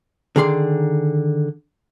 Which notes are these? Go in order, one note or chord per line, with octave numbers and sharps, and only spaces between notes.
D3 D#3 G#4 D5 C6